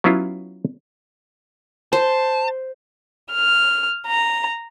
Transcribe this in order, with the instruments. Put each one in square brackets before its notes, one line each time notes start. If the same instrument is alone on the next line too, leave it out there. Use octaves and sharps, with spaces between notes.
[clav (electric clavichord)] F#3 B3 C#4 E4 F4
[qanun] C5 [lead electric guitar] A5
[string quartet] F6
A#5